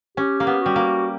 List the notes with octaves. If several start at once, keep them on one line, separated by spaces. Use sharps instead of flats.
C#4 G4
A#3
B3
G3 F#4
A#3